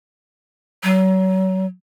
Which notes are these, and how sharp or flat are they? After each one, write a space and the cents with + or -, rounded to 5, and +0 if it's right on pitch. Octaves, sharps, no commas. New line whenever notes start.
F#3 +30